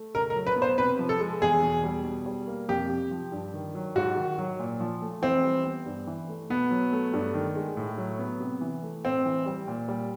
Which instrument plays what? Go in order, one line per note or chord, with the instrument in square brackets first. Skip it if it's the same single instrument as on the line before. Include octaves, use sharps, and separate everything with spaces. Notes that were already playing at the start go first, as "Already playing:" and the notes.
Already playing: [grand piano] A3
[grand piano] C#3 [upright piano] A#4
[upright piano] A#4
[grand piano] F#3
[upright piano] B4
[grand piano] B3
[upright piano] C5
[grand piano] C3 [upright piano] B4
[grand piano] F3
[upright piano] A4
[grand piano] G#3
[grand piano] E2 [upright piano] G#4
[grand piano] B2
G3
B2
G3
A#3
[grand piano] F2 [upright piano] G4
[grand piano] C3
F3
G2
D#3
F#3
[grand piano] G#2 [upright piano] F#4
[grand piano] D#3
F#3
A#2
F3
A3
[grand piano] E3 [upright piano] C4
[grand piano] G3
B3
G2
E3
A3
[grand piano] B2 [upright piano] B3
[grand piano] F#3
A3
G2
D#3
G#3
A2
F#3
B3
C3
E3
A3
[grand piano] A2 [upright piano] C4
[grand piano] E3
G3
A#2
G3